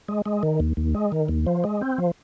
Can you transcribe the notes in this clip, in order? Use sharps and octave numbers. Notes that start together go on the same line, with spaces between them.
G#3
G#3
D#3
D#2
D#2
G#3
D#3
D#2
F3
G#3
C4
F3